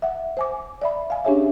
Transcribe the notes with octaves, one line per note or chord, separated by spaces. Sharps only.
E5 F#5
C5 G#5 D6
D5 E5 B5
F5 G#5
C#4 D4 G4 G#4 C#5 E5